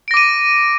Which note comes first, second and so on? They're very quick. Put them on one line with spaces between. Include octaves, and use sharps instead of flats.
D7 A#6 D6 D#7